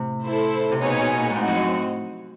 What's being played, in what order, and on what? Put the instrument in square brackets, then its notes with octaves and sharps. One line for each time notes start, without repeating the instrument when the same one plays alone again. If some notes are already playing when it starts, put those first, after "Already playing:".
Already playing: [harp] A2 C3
[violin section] E4 A4 C5
[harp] C3
[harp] B2 [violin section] B3 D#4 G#4 C#5
[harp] A#2
B2
B2
A#2
G#2
[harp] A2 [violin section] C4 D#4 F#4
[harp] F2
F#2